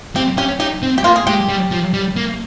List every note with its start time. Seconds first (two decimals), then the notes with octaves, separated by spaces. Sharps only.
0.16 C4 G4
0.37 C#4 G4
0.60 D#4 G4
0.83 C4
0.98 G4
1.04 A#3 F4
1.16 G#4
1.27 G#3 G4
1.49 G3
1.71 F3
1.94 G3
2.16 A#3